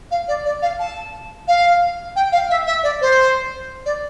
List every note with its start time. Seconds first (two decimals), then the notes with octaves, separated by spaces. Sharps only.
0.11 F5
0.28 D5
0.45 D5
0.62 F5
0.79 A5
1.48 F5
2.16 G5
2.32 F5
2.50 E5
2.66 E5
2.83 D5
3.01 C5
3.85 D5